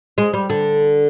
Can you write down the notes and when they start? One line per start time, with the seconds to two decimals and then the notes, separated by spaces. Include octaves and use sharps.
0.18 G#3
0.34 G3
0.50 D3